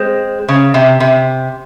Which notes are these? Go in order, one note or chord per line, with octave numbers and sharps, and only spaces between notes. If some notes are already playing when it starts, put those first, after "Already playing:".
Already playing: G#3 C4
C#3
C3
C3